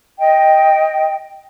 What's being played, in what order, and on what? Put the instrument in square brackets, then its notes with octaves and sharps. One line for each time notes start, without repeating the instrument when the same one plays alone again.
[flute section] D#5 G5